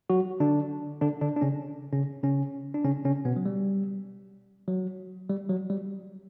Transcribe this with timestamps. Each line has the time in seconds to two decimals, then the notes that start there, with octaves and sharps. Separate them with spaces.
0.10 F#3 F#4
0.40 D3 D4
1.01 D3 D4
1.22 D3 D4
1.37 D4
1.41 C#3 C#4
1.93 C#3 C#4
2.23 C#3 C#4
2.74 D4
2.84 C#3 C#4
3.05 C#3 C#4
3.25 B2 B3
3.36 F#3
3.46 G3
4.68 F#3
5.29 G3
5.49 F#3
5.70 G3